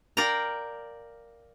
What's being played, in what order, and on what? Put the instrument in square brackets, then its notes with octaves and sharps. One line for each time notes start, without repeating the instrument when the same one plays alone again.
[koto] A#4 D5 F5 G5 A#5